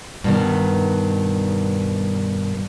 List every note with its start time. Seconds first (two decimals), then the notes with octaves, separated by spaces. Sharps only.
0.24 G2 B2 D#3